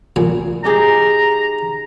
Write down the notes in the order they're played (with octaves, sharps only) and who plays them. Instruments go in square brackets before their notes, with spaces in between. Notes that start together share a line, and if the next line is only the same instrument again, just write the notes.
[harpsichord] A1 A#2 G#5
[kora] D#4 G4 G#4 [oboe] A#5